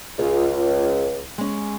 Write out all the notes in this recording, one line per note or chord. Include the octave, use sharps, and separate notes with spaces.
C#2 F4 C#5
G#3 C#4